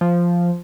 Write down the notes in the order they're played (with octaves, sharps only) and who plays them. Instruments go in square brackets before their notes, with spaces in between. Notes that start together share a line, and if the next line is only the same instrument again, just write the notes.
[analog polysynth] F3